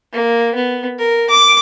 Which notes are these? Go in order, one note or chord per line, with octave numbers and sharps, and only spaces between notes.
A#3
B3
A#4
D6